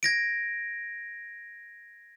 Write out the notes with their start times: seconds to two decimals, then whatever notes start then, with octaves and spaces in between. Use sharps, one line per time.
0.03 G#6 A#6 D7